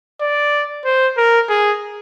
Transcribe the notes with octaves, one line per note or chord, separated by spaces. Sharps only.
D5
C5
A#4
G#4